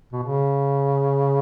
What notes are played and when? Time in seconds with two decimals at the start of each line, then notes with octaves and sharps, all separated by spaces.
0.12 B2
0.23 C#3